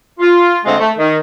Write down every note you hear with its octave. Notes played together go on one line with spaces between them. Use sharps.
F4
D3 G#3 A3 C4 F4 D#5
A3
D#3